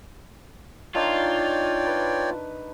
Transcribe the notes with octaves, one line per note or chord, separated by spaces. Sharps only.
D#3 D4 D#4 F4 C#5 D5 G5
B4